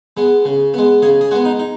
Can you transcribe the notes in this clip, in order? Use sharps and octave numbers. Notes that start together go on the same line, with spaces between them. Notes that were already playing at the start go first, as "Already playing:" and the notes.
G#3 B3
C#3
G#3 B3
C#3 G#4
G#4
G#3 B3 F#4
D#4
D#4